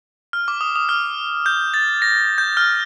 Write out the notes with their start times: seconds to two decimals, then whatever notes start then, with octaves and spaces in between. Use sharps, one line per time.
0.33 F6
0.48 D6
0.61 D#6
0.76 D#6
0.89 F6
1.46 G6
1.74 A6
2.02 A#6
2.38 G6
2.57 F6